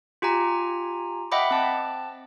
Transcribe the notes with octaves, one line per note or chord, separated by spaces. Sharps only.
F4 G4 G#5 A#5
D#5 E5 F#5 G5 B5 D6
C4 A5